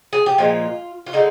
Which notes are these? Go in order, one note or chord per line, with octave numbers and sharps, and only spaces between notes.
G#4
G4
A#2 F3 G#3 F4
F4
D3 G#3 D#4